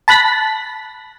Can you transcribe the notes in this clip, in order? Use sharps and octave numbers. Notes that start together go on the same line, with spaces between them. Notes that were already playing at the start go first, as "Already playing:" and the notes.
A5 B5 F#6 A#6 B6